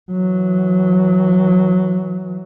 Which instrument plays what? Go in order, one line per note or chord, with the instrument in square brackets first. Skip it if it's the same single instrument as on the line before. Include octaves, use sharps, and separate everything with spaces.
[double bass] E3 F#3